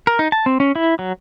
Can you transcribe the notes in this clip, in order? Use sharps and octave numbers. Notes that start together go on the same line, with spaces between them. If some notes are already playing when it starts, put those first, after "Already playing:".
A#4
D#4
A5
C4
C#4
E4
F#3